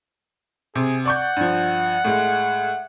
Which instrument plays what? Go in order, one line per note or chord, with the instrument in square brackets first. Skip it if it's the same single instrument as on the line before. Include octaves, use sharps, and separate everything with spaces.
[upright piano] C3 [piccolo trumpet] G#4
[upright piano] D5 C#6 G6 [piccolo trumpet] F#5
[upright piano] G2 F3
A2 G#3